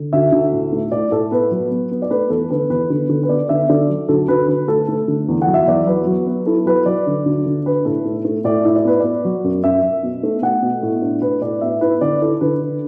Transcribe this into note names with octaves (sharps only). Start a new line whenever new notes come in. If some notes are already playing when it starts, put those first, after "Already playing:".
Already playing: D3
D2 E5
D2
A2
A3
A2 D5
A2 A4
B3 B4
F#3
B3
B3
D5
A3 B4
E2 A4
D3 B4
E2 B4
D3
D3
B4
B3 D5
D3 E5
D3 D5
F#3
D2 A4
D2 B4
D3 B4
A3 A4
A3
D3
E2
F#5
F#3
E5
E2 D5
F#3 B4
F#3
B3
E4 A4
F#3 B4
F#3 D5
D3
D2
D3
D4 B4
A2 A4
A3
A3
A2 D5
E4 E5
D5
B3 B4
B3 D5
F#3
F#2
F#2 E5
F#2
B2
A3
A3 F#5
B2
A2
D4
A2 B4
A2 D5
B3 E5
E4 B4
D3 D5
E4 A4
D3 B4
D4